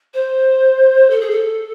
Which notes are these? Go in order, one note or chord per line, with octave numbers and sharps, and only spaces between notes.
C5
A4
G#4
A4